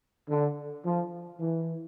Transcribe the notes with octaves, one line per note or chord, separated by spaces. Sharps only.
D3
F3
E3